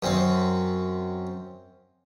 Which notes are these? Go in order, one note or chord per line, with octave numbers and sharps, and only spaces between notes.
F#2 C4